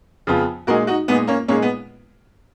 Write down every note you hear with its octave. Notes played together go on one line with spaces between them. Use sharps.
F2 C#3 F3 B3 F4
A#2 G#3 D#4 F#4 G#4 A#4
D#4 F#4
A#2 G#3 B3 D#4 G#4
A#3 C#4
A#2 G#3 A#3 C#4 D#4 G#4
B3